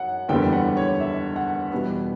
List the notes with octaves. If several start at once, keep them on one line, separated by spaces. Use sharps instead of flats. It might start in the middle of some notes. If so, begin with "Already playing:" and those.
Already playing: F#2 F#5
F#1 E2 D3 G3 B3 G5
F#5
C#5
E5
F#5
E2 B2 G3 B3